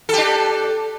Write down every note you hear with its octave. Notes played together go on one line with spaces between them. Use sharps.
D4 G4 A4